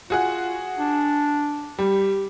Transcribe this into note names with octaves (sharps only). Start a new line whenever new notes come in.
F4 F#4 G#4 F#5
D4
G3 G4